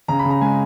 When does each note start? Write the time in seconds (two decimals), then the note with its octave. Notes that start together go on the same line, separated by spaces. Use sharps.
0.08 C#3 A#5
0.19 B5
0.25 C#3
0.30 A#5
0.41 G#3 G#5